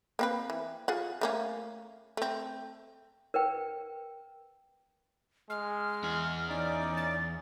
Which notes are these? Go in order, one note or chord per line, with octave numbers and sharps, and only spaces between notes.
A#3 C4 B4
E3
F4 G#4 F#5
A3 A#3 C#4
A3 C4
A#4 B4 G5
G#3 F6
E2 G#4
C#4 D#4 D5 D6
A6